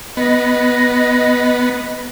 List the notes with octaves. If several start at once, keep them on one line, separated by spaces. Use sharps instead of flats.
B3 D#5